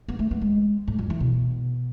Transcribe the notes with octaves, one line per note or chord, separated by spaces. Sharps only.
B3
A3
B3
G#3
A2
F2
E3
B2